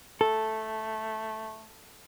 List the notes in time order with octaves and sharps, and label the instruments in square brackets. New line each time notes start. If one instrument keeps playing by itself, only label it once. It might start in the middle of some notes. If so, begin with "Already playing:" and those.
[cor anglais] A3 [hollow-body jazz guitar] A4